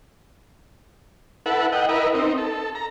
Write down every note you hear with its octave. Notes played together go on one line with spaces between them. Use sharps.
E4 A4 B4 F#5
D#5 F#5 G5
E4 A#4 B4 D#5
C4 D#4
A4
A#5